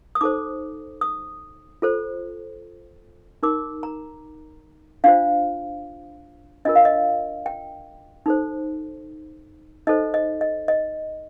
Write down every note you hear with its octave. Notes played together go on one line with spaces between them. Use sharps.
D#6
D#4 A4 C5 D6
D#6
F4 A4 C5
D#4 A#4 D6
A#5
D4 F4 C5 F5
D4 F4 A#4 D#5
F5
D#5
G5
D#4 A4 C5
D#4 A4 C5 D#5
D#5
D#5
D#5